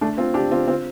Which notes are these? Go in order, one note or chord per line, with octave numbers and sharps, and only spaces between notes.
A3 D4
C4 F4
D4 G4
C4 F4
C4 F4